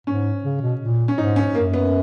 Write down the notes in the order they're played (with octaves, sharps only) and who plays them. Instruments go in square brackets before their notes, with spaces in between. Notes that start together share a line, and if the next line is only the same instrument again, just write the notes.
[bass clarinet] G#2 [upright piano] C#4
[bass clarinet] C#3
B2
A#2
[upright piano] C#4
[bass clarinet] G#2 [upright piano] D#4
[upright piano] C#4
[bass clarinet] F#2 [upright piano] A#3
[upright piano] B3